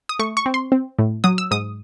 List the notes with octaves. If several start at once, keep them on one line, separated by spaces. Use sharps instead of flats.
D#6
A3 C#6
C#6
C4
C6
C4
A2
F#3 D#6
E6
G#2 D#6